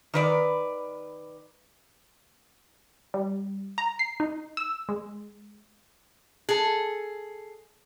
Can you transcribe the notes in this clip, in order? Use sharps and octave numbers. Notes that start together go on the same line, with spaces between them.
D#3 B4 D5
G3
A#5
C7
D#4
E6
G#3
G#4 A4